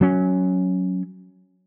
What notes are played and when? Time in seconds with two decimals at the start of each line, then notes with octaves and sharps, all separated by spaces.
0.01 F#3 C#4